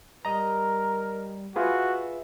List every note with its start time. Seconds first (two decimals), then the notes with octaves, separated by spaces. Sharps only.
0.25 G3 A#4 D#5 A#5
1.56 F4 F#4 G#4 B4 E5